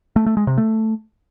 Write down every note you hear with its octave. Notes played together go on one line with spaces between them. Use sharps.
A3
A3
G#3
C3
A3